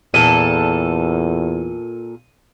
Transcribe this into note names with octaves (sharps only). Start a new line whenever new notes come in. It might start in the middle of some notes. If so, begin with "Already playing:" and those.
E2 A#2 A4 D#7